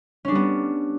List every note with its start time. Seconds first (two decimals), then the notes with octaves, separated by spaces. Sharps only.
0.25 C#4
0.28 D4
0.32 G3
0.35 B3